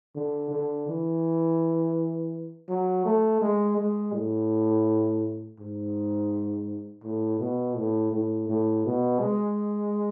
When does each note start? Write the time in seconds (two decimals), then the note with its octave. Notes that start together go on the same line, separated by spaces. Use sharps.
0.15 D3
0.51 D3
0.88 E3
2.69 F#3
3.05 A3
3.42 G#3
3.78 G#3
4.13 A2
5.59 G#2
7.04 A2
7.40 B2
7.76 A2
8.13 A2
8.49 A2
8.85 B2
9.20 G#3